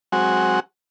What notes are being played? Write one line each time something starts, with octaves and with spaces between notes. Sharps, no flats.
F#3 G#3 C4 F#4